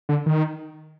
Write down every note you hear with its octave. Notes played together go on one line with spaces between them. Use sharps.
D3
D#3